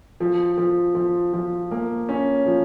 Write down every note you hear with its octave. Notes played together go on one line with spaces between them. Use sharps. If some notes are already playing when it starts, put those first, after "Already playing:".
F3
F3
F3
F3
A#3
C#4
F3